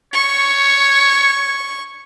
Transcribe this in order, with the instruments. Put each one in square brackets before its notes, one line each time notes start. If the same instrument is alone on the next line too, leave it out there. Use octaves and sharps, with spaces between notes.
[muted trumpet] C#5 [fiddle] C#6